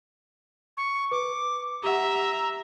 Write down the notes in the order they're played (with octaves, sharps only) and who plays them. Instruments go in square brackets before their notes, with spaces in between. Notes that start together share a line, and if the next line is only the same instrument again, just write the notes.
[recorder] C#6
[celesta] B4 [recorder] D6
[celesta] G4 F#5 [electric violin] E5 [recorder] A#5